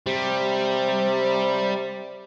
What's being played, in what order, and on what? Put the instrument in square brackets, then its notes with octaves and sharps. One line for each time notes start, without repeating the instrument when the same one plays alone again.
[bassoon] C3 [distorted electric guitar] G3